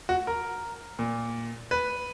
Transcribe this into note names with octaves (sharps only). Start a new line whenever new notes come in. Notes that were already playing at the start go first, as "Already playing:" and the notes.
F#4
A#4
A#2
B4